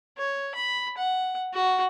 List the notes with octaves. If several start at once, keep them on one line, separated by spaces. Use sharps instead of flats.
C#5
B5
F#5
F#4